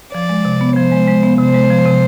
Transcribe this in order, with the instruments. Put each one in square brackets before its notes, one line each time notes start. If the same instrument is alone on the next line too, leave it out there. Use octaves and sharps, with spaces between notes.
[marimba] F3 [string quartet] D5
[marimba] G#3
C3
B3
[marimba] F3 [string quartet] C5
[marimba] G#3
G#3
B3
[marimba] C3 [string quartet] C5
[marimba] G#3
F3
C3